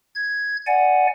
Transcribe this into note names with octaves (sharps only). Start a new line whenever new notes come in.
G#6
D5 F#5 G#5